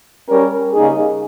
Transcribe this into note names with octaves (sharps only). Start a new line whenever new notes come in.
G3 C#4 G4 A#4
C#3 G3 A#3 D#4 G#4